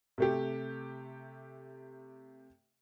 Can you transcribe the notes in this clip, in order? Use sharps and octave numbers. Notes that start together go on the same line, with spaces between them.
C3 A3 G4